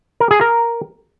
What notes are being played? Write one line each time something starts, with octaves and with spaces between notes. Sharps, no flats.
A#4
G#4
A#4